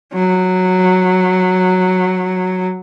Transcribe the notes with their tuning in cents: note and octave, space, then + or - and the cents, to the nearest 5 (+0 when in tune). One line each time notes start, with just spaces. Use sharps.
F#3 -5